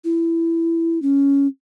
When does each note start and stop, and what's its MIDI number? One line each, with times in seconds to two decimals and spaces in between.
0.04 1.01 64
1.02 1.47 61